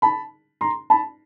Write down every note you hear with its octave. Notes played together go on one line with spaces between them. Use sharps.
A5 B5
A#5 C6
A5 B5